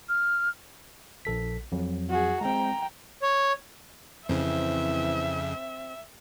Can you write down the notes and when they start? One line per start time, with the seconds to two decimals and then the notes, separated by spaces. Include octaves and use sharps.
0.09 F6
1.25 A#1 A4 B6
1.72 F2 F#3
2.10 F#4 G#4
2.41 G#3 C4 G5 A#5
3.22 C#5
4.29 F2 C#3 E3 C4 E5